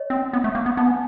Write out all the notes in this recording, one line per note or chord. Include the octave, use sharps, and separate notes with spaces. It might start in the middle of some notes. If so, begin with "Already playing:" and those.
Already playing: C#5 D#5
C4
B3
A3
A#3
B3
B3 A5
G#5